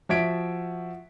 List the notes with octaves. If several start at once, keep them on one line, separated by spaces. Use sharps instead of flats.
F3 F#4 E5 G#6 B6 D7